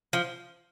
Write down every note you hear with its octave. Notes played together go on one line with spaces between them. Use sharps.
F3